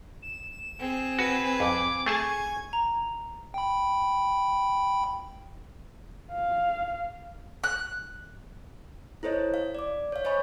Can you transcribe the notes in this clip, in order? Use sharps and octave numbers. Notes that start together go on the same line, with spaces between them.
E7
C4 G#4
F#4 B4
F2 D6
A3 G#4 G#5 A5 C#6
A#5
G5 B5
F5
F#6
E4 A4 C5 C#5 D#5
F5
D5 D6
C#5 F5
C5 C#5 D#5 G#5 B5 C#6